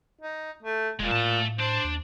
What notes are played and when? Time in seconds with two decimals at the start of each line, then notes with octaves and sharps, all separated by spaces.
0.21 D#4
0.63 A3
1.00 E1 A#2 G3 G#3
1.11 A2 A3 A5
1.59 D4 C5
1.84 D#2